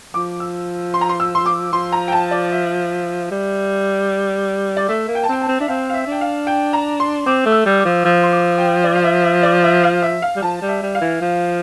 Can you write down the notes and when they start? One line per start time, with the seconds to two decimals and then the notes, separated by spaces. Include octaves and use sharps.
0.14 F3 D6
0.40 E6
0.94 C6
1.01 A#5
1.09 C6
1.20 E6
1.35 C6
1.46 D6
1.73 F3 C6
1.92 A#5
2.08 G5
2.12 A5
2.31 D5
2.52 E5
3.31 G3
4.77 D5
4.89 A3 E5
5.08 A#3
5.15 G5
5.23 A5
5.29 C4 G5
5.41 A5
5.48 C4
5.60 D4 E5
5.68 C4 F5
5.90 F5
5.94 E5
6.07 D4
6.12 G5
6.21 F5
6.47 G5
6.73 A#5
7.00 C6
7.26 C4 D6
7.46 A3
7.52 E6
7.66 G3
7.79 D6
7.85 F3
8.05 F3 E6
8.23 C6
8.32 D6
8.58 G5
8.84 D5
8.95 F5
9.04 E5
9.24 E5
9.43 D5
9.63 E5
9.83 F5
10.02 E5
10.22 F5
10.36 G3
10.42 F3 A5
10.62 G3
10.68 E5
10.82 G3
10.95 F5
11.01 E3
11.22 F3